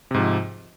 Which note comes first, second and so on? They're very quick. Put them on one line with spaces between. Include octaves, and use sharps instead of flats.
C3 G#2 F3